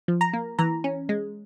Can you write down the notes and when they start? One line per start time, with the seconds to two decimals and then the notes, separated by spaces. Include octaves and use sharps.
0.08 F3
0.21 A#5
0.33 A#3
0.59 E3 A#5
0.84 C#4
1.09 G#3